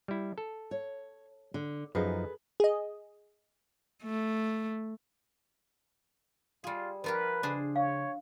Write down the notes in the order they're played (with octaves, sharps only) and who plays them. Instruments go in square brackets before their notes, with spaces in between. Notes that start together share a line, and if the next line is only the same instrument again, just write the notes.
[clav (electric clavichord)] G3 E4
A4
[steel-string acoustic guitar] C#5
D3
[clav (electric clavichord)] F#2 F3 D#4 [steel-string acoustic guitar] G#4 A4 B4
[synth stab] G#4 D#5
[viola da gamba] A3
[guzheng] G3 G#4 [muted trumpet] F4
[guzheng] F3 F4 G4 [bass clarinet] A#4 [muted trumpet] B4
[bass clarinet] C#3 [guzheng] D4 G#4 C5
[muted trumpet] C#5 [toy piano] F5